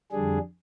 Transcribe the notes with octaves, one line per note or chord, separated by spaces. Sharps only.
F2 D3 G3 D4 G#4